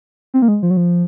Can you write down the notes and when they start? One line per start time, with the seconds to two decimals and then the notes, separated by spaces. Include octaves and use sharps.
0.34 C4
0.42 A#3
0.48 G#3
0.63 F3
0.70 F#3
0.77 F3